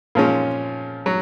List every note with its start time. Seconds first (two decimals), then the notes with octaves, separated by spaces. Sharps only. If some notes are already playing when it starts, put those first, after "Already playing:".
0.15 A#2 F3 G#3 C#4
1.06 F#3